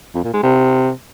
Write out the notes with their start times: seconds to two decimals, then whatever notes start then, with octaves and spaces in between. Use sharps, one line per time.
0.15 F2
0.24 A#2
0.34 G#3
0.43 C3